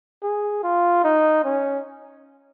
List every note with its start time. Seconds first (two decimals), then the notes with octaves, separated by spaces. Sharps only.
0.23 G#4
0.63 F4
1.04 D#4
1.44 C#4